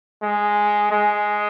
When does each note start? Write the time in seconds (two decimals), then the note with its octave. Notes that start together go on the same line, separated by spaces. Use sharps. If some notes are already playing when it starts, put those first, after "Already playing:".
0.22 G#3
0.91 G#3